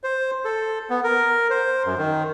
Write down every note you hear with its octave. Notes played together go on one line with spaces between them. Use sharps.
C5
A4
B3
A#4
C5
F#2
D#3